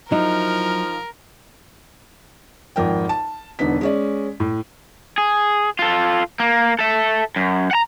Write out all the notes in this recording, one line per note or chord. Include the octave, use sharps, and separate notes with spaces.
F3 F#3 D#4 E4 A#4
G#1 F2 A#4 G5
A5
E1 D3 B3 D#4 B6
G#3 C#4 D5
A2
G#4
F4 A4
A#3
A4 E5
F#2
F#5 A#5